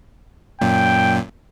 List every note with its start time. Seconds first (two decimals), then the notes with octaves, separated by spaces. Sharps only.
0.61 F#2 A#2 G5